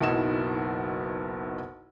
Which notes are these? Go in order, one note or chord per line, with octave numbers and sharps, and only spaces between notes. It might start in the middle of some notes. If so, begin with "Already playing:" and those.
F#1 B1 B2 D#4 E4 E7